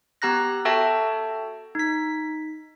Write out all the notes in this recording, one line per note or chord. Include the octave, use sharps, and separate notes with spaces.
B3 G4 A#5 F#6 A#6
F#4 A4 E5 G5 A5
D#4 B6